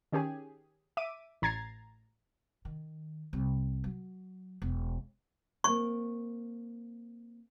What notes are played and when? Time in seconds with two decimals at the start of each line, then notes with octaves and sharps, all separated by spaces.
0.12 D#3 C#4 G4 G#4 G#5
0.97 E5 D6 D#7
1.42 A1 A#5 G#6 A6 C7
2.65 D#3
3.33 C2
3.84 F#3
4.62 E1
5.64 A#3 C4 C#6